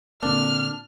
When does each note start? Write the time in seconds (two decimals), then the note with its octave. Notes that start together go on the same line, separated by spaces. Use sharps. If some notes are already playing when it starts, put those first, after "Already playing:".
0.22 A#2 D3 A#3 C4 D4 F6